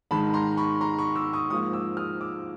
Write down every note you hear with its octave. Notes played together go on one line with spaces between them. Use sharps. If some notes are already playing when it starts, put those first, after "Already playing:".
G#2 D#3 G#3 A5 B5
A#5 C6
B5 C#6
A#5 C6
B5 C#6
D6 E6
C#6 D#6
G#2 F3 A#3 C#6 D#6
D6 E6
D#6 F6
D6 E6